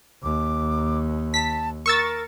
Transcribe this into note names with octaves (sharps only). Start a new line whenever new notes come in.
D#2 D6
A5 B6
A#4 C#6 E6 A6